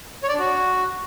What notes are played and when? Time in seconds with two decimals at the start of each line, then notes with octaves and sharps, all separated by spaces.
0.23 C#5
0.29 D5
0.34 D4
0.39 F#4